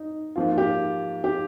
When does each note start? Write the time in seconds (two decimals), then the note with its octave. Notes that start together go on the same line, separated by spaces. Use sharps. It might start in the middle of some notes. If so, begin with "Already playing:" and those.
Already playing: D#4
0.36 G#2 F3 A#3 F4
0.51 F4
0.58 G4
1.24 G4